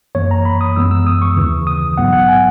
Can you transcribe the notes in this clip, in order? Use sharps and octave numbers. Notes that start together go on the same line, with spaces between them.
F#2 E3 A#3 C#5
A#5
B5
D#6
F#2 E3 G#3 B3 E6
E6
D#6
C#6
D#2 C#3 E3
D#6
A#1 G#2 F#3 B3 F#5
F#5
G#5